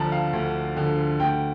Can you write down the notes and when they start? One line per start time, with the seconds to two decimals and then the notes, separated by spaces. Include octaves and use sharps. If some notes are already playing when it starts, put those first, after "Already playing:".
Already playing: D2 D3 F3 A5 A#5
0.12 F5
0.33 D2
0.77 D3 F3
1.20 D2 G5